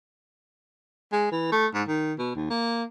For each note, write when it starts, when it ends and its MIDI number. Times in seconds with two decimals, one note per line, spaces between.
1.12 1.30 56
1.31 1.48 52
1.52 1.67 57
1.74 1.83 44
1.88 2.13 51
2.18 2.33 47
2.35 2.48 39
2.50 2.84 58